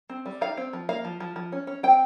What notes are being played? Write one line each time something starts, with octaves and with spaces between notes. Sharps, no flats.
C4
G3
D#4 F5
C4
F3
A#3 F5
F3
F3
F3
C#4
C#4
C4 G5